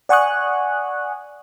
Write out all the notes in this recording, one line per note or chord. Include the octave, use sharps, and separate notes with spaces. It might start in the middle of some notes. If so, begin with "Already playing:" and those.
D5 F#5 G#5 C#6 D#6 F#6